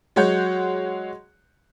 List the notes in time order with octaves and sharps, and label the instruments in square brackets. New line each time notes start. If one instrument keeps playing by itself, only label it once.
[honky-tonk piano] F#3 G#3 C#5 F#5 G6